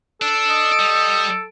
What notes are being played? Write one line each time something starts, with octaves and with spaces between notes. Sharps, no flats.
D4 A4
D#5
G3